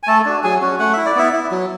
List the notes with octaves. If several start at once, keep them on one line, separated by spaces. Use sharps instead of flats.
G#5
A3 A4 A5
D4 F#4
F#3 G#4 G#5
C#4 F#4
A3 F#5
E4 E5
D5
B3 E4 E5
E4
F#3